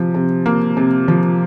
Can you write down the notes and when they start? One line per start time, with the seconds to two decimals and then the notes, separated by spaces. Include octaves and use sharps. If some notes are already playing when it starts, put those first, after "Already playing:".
Already playing: C3 F3
0.14 C3
0.46 A#3
0.77 C3
1.08 F3